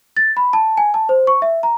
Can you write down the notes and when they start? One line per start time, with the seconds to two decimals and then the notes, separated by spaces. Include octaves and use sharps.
0.17 A6
0.37 B5
0.53 A5
0.77 G#5
0.94 A5
1.09 C5
1.27 C#6
1.42 E5
1.63 A#5